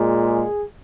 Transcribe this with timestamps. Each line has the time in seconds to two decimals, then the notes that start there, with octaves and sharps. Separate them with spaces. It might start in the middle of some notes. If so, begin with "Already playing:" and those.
Already playing: A#2 G#3
0.29 G#4